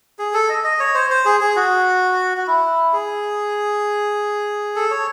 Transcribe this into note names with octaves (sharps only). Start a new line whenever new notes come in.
G#4
A4
D#5
D#5
C#5
C5
C5
G#4
G#4
F#4
F#4
E4
G#4
A4
C#5